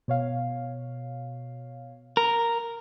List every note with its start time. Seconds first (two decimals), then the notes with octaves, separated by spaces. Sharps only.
0.08 B2 C#5 F5
2.17 A#4